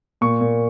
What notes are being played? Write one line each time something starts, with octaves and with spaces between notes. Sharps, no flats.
A#2 C#6
A#2